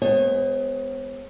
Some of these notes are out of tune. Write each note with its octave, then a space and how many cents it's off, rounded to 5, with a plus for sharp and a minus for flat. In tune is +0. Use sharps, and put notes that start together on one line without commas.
G#3 +0 B3 +30 C#5 -45